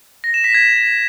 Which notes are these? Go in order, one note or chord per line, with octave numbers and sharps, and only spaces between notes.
A#6
E7
B6
G#6